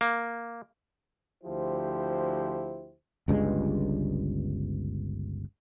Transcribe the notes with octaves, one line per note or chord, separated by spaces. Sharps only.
A#3
D2 F3 E4 G4 C5
G1 C#2 G2 G#3